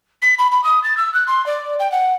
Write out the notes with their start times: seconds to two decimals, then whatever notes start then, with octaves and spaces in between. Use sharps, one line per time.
0.22 B6
0.38 B5
0.51 B5
0.64 D#6
0.83 A6
0.97 E6
1.14 F#6
1.27 C6
1.46 D5
1.79 G5
1.92 F#5